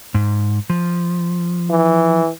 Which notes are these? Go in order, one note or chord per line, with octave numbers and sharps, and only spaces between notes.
G#2
F3
E3